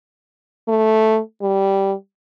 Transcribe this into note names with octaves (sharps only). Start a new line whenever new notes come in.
A3
G3